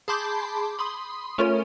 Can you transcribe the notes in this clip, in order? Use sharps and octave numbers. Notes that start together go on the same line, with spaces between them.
G#4 A5 B5 C6 D6 G6
B5 C6 D#6
A3 C#4 F4 A#4 C#5